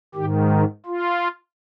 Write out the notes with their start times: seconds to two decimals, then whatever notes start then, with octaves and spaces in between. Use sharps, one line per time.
0.15 G#2 D#3 G4
0.51 D#4
0.86 F4